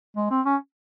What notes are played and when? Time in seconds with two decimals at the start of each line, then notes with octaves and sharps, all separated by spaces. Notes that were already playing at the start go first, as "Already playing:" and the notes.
0.17 G#3
0.30 C4
0.46 C#4